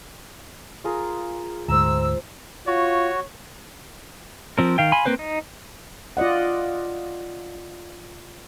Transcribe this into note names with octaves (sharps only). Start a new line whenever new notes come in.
F4 G#4 A#4
D2 G#2 C5 A#5 E6
F4 F#4 C#5
F3 C4 A#4
D#3 F5 G5
F5 G#5 B5 C6
A#3 C4 B4 C5
D#4
F4 D5 D#5 F#5